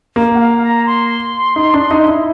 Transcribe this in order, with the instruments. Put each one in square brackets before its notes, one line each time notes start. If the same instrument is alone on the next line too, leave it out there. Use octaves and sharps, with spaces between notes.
[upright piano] A#3
[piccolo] F#5
F5
A#5
C6
[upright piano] D#4
D4
D#4
E4